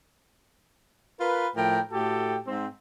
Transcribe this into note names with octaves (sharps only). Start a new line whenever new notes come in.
F4 A#4 B4
A2 F3 A#4 G5
A2 F#4 G4 A4 G5
G#2 C4